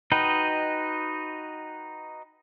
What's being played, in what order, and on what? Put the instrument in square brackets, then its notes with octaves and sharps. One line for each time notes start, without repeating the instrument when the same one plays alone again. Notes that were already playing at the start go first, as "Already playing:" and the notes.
[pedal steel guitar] D#4 F#4 B4 D#5 G5